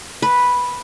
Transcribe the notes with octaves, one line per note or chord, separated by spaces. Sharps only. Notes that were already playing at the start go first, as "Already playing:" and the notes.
B4